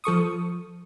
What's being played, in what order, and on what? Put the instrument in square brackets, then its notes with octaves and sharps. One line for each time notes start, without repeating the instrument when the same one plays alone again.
[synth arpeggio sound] F3 A4 C#6 D#6